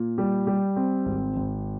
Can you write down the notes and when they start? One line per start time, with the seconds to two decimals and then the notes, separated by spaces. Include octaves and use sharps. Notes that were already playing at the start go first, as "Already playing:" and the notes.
Already playing: A#2
0.18 G3
0.47 G3
0.76 C4
1.05 G#1
1.36 G#1